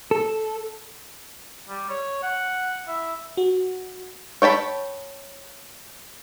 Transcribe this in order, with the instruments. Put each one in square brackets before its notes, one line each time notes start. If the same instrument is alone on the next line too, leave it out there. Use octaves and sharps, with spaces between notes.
[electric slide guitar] A4
[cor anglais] G3
C#5
F#5
E4
[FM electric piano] F#4
[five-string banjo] C#5 G5 A5 B5